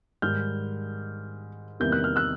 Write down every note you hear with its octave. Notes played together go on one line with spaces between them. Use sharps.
G#2 D#3 G3 F6 G6
E2 C3 D#3 G3 A#3 G6
F#6
F6
E6 F#6